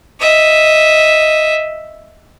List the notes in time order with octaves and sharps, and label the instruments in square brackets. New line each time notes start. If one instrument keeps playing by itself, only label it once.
[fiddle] D#5 E5